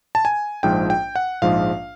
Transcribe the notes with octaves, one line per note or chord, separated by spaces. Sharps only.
A5
G#5
A#1 G#2 F3 G5
G5
F#5
A#1 G#2 F3 F5